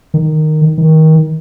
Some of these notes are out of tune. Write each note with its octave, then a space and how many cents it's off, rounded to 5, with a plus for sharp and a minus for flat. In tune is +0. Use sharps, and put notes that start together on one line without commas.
D#3 -10
D#3 +25